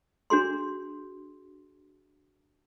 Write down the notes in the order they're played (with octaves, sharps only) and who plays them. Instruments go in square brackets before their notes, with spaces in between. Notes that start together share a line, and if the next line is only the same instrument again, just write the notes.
[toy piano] D4 F#4 G#4 C6